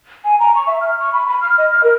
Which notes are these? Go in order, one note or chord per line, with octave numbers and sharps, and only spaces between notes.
G#5
A#5
C#6
E5
F6
C#6
B5
B5
F6
D#5
F6
A#4